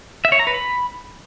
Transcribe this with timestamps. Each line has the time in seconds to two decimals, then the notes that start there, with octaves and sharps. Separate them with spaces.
0.25 E5
0.32 C#5
0.39 A#5
0.47 B4
0.54 B5